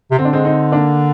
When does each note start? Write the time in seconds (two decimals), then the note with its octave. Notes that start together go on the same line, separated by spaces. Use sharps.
0.11 C3
0.19 D3 C4
0.25 D4
0.33 G#3 C4
0.45 C4 D#4
0.72 A#3 D4